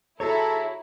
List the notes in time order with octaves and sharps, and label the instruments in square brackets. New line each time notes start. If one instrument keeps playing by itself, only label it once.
[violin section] E4 [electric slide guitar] F#4 G#4 C#5 [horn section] A4 [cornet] A#5